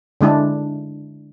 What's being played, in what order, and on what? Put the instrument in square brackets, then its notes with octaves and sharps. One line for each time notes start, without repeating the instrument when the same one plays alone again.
[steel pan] D3 G#3 D4 E4